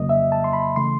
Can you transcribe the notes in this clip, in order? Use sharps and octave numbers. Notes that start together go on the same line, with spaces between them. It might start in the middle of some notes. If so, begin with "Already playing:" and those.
Already playing: F2 C#3 F#3 A#3 D#5
E5
A5
C6
B5
C#3 E3 A3 C6